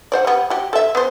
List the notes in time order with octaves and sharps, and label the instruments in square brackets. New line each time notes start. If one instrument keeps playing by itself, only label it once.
[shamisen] F#4 C5 D5
G3 B3
F#4 G4
A4 E5
B3 C5